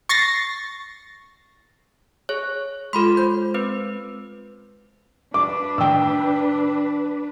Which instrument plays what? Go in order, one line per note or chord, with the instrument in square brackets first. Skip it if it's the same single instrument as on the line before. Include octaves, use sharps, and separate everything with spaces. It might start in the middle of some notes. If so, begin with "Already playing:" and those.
[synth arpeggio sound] C#6 A6 A#6 C7
[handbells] G#4 C#5
[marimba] G#3 F4 F6 [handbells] A4 B5 C6
[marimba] C5 [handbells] G6
[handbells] C4 B4
[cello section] D4 B4 [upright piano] D6
[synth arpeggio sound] A2 D#3 [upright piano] G5 E6